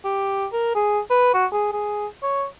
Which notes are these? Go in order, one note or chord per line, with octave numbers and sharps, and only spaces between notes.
G4
A#4
G#4
B4
F#4
G#4
G#4
C#5